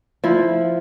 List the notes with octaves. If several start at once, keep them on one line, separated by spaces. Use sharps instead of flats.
F3 E4